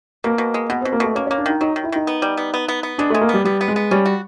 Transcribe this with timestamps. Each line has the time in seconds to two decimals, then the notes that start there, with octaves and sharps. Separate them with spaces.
0.24 B2 A#3
0.38 B2
0.54 G#3
0.69 B2 B3
0.81 B2 C4
0.92 A#3
1.00 B2 A3
1.15 A#3 C#4
1.27 A#3 C#4
1.38 D4
1.46 D#3 D#4
1.61 F#3 D#4
1.76 D#3
1.84 E4
1.92 D#3 D#4
2.07 B3
2.22 G3
2.37 B3
2.54 B3
2.68 B3
2.83 B3
2.98 G#3 D4
3.10 G#3 A3
3.21 A#3
3.29 G3 B3
3.45 G3 B3
3.61 B3
3.68 G#3
3.76 B3
3.91 G3 C#4
4.06 F#4